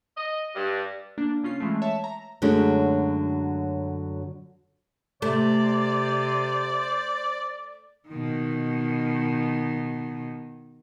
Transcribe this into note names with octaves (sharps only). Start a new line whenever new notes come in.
D#5
G2
A#3 D4
C#3 C#4 F4 C7
E3 G#3 A3
C#5 E5 A5
A#5
F#2 D3 F#3 G#3 A3 C#4
C3 A3 C5 D5
B2 D#3